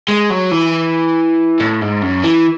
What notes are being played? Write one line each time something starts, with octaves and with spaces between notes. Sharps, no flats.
G#3
F#3
E3
A2
G#2
F#2
E3